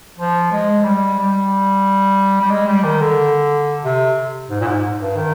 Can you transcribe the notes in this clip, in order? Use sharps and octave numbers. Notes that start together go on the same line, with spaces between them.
F3
G#3
G3
G3
G3
G#3
G3
D#3
D3
C3
G#2
A#2
G#2
G2
D#3